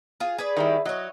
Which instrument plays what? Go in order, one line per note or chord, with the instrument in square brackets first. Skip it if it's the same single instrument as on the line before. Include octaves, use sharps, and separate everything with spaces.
[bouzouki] F4 G#4
G#4 B4 D5
[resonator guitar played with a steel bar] D#3 G3 E4
[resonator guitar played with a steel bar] F#3 [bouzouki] C#5 D#5